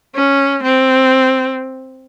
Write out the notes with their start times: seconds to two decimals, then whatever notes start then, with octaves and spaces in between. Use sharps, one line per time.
0.15 C#4
0.63 C4